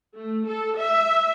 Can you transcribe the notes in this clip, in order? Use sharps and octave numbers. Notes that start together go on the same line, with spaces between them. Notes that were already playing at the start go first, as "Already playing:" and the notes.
A3
A4
E5